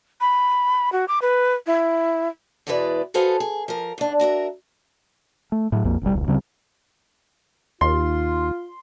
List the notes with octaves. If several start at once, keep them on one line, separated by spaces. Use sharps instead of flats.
B5
F#4
D6
B4
E4
E2 B2 G#3 E4 B4 D5
F#4 G#4 A4 B4 C5 F5
G#4
F3 A#4
G#2 D4
F#4 A#4 C#5 E5
A3
A2 F#3
A#1 F2 A#3
F1 B1 C#3 G3
D#1 C#2
D2 C#3 G3 C4
D#2 F4 C6